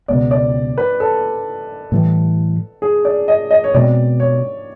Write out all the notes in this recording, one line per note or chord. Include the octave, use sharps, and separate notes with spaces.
C#2 B2 G#3 B3 D5
D5
B4
A4
A2 E3 G3
G#4
D5
D#5
D#5
C#5
B2 G#3 C4 D5
C#5